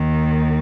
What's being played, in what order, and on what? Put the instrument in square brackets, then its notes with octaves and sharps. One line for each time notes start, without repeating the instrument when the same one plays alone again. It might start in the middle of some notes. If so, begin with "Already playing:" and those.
Already playing: [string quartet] D#2 D#3